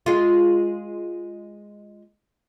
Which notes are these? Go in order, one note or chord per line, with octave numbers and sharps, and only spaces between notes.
G#3 F4